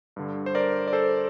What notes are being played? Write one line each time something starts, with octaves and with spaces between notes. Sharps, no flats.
G2 D3
C5
A#4 D5
D5
A4 C5